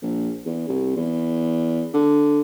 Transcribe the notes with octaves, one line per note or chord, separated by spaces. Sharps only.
A#1
E2
C2
E2
D3